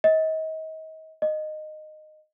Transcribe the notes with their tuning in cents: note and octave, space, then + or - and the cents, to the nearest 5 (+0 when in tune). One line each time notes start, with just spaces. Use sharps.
D#5 +35
D#5 -15